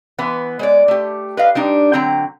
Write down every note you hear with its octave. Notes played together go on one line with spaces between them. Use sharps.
E3 B3 B4
G#3 C#5 D5
A3 G4
B4 D#5 F5
G3 D4 D#4
D3 F#3 C4 G5 A#5